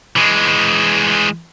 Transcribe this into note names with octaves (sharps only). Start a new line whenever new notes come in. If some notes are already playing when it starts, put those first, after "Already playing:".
E3 G#3